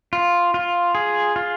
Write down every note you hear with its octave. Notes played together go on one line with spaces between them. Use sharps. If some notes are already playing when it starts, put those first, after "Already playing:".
F4
F4
G#4
F4